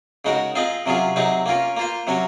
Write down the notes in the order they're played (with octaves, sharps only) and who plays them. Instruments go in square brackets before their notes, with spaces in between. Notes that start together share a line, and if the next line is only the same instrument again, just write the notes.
[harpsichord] C#3 G#3 D#4 F#4 A#4
C4 F4 G#4 D#5
C3 F#3 C#4 F4 G#4
C3 F#3 C4 D#4 G#4
A#3 C#4 F4 A#4
A#3 F4 C5
C3 F#3 C#4 F#4 C#5